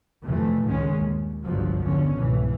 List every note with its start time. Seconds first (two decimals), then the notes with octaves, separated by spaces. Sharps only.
0.23 F2 C3 E3 A3
0.64 C#2 G2 A#2 D#3 G#3 C#4
0.96 D#2
1.45 G1 C2 G2 C3 F3 F#3
1.83 E2 D3 C#4
2.18 C2 G#2 B2 E3